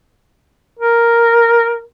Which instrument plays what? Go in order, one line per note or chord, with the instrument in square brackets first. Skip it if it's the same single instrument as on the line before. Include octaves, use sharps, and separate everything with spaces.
[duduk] A#4